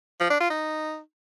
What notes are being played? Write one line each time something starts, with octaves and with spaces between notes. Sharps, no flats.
F3
D4
F4
D#4